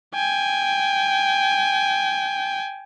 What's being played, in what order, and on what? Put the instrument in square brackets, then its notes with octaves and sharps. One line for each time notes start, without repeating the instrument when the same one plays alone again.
[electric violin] G5 G#5